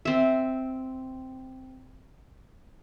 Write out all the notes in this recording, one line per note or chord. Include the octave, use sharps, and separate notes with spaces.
C4 E5